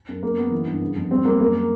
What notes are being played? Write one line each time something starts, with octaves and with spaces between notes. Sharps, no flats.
F#2
F#2 A#3
F#2 B3
E3
G2
C#3
F2
G3 C4
G3 A#3
F#2 A#3